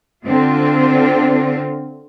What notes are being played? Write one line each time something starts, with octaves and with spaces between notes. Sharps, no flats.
D3 C4 F4